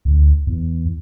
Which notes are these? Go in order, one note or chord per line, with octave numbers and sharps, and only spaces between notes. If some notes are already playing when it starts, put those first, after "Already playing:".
D2
E2